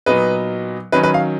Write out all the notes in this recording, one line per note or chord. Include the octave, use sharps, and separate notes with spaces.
A#2 F#3 B3 D#4 B4
D#3 F#3 C#4 B4
B4
F5